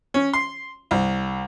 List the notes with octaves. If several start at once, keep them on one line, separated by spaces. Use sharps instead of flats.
C#4
C6
C2